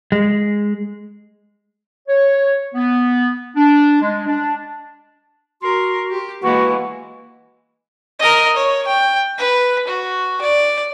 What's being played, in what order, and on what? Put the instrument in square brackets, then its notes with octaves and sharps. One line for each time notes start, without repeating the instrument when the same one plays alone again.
[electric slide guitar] G#3
[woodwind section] C#5
B3
D4
G#3
D4
[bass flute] F#4 [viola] A#4 [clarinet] C6
[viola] G4
[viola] E3 G#3 [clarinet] A#3 [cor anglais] F#4 [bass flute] B4
[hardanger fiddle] A#4 D#5
C#5
G5
B4
F#4
D5